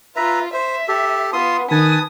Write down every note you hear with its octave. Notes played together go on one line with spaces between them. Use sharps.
F4 B4 E5 A#5
C5 E5
G4 A4
B3 F4 C6 D#6
D#3 B4 G#5 A5 D#6